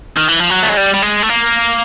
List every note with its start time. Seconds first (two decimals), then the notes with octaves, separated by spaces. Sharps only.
0.17 D#3
0.28 E3
0.39 F3
0.50 F#3
0.62 A3
0.69 G#3
0.77 G3
0.94 G3
1.03 G#3
1.23 A3
1.29 A#3